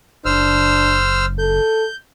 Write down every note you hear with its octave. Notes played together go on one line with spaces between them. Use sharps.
F#1 D4 C5 E6 F6
A4 G6